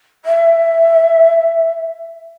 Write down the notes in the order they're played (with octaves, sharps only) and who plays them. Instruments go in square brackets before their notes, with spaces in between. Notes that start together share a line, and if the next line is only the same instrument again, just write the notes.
[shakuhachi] E5